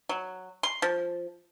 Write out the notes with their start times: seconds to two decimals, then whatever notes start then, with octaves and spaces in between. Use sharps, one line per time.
0.09 F#3
0.63 C6
0.82 F3